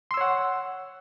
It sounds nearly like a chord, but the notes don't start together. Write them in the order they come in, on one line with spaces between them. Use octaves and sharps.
C6 E6 C#5 F#5